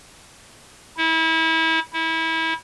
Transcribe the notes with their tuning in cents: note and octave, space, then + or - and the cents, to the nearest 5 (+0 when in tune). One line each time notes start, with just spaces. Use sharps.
E4 -30
E4 -25